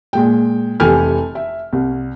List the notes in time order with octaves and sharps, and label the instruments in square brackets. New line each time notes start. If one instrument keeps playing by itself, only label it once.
[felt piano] A#2 G#3 G5
F1 E3 G4 A4 G#5 F6
E5
C2